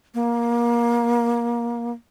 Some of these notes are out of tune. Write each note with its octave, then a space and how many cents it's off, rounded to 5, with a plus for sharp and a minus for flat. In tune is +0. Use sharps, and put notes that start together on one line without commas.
A#3 +25